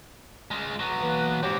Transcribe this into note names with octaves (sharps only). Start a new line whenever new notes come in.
G#3 F4
F#3 B3
E3 A#3 B4
G#2 C4 G4 C#5 D6